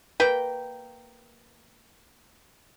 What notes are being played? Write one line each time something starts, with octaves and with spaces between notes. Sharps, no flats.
A#3 B4 G5